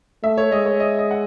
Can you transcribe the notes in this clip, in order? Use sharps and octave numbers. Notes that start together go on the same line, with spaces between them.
A3 E5
C#5
G#3 D#5
C#5
D#5
D#5
F#5